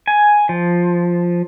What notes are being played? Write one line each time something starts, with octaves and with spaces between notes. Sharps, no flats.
G#5
F3